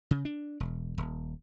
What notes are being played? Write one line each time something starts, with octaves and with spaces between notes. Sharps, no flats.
C#3
D4
E1
D#1